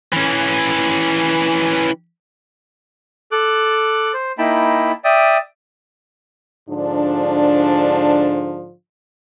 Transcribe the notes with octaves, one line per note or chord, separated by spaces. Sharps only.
E3 C#4
A4 D6 F#6
C5
A#3 D#4 E4 G5 A5 B5
D5 E5 G5 D#6
G#2 D3 F3 D4